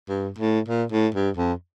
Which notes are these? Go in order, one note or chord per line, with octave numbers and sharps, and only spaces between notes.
G2
A2
A#2
A2
G2
F2